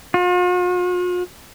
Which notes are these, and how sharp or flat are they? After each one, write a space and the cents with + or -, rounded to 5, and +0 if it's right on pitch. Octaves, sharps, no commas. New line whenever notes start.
F4 +45